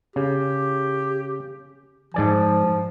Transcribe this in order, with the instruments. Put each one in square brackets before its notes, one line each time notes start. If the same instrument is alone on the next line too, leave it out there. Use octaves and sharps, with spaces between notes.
[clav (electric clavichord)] C#3 [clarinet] G4
[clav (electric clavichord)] G#2 D5 G#5 [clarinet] F3